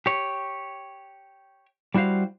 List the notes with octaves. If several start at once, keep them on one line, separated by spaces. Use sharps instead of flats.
G4 C#5
G3 E4 F#4 C5 F5